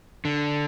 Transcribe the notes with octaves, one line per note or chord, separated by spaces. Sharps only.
D3